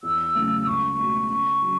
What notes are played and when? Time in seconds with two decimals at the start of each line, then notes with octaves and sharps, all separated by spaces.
0.03 E2 E6
0.35 C#3 F#3 A3
0.67 C#2 C#6
0.97 B2 A3
1.30 C#3
1.62 F#3 C#4